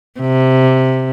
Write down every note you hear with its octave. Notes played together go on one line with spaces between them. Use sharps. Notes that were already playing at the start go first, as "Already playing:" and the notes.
C3